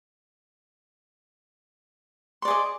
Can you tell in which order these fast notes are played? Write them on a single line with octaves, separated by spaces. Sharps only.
C6 D5 G#4 D#5